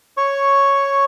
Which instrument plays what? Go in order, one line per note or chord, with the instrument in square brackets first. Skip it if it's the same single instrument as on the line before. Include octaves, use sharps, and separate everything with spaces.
[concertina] C#5 C#6